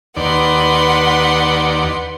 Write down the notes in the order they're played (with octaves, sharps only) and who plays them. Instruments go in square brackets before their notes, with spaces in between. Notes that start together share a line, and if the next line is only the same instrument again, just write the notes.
[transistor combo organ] D#2 D5 [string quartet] B4 F#5 C6